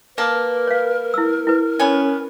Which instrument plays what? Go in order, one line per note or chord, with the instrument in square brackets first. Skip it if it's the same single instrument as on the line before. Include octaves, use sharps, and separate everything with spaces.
[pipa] A#3 A5 [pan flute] A#4 [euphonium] B4
[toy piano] C#5 F5
E4 E6
E4 B4
[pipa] B3 C#5 G#5 [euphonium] C#4